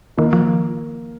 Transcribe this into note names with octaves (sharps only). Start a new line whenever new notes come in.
D#3 A#3
F3